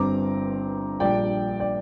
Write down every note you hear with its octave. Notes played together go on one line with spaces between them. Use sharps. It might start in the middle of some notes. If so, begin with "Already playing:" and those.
Already playing: G1 G2 G3 C4 A#5 D6
A#1 A#2 G3 D4 D5 G5
D5 G5